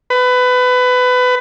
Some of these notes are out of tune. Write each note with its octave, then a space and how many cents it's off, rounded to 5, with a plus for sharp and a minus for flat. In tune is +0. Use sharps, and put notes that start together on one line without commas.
B4 +20